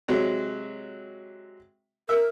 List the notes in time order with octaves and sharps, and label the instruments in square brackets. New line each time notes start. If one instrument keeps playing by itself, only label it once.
[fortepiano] C3 F#3 G#3
[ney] A#4 [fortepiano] E5